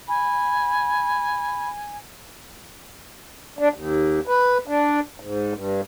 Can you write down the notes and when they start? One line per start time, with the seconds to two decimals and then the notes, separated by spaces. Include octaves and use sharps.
0.08 G#5 B5
3.59 D4
3.74 D#2
4.27 B4
4.68 D4
5.20 G#2
5.54 G2